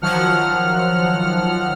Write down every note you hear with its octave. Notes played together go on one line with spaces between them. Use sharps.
D#3 F3 F#3 F#5 F6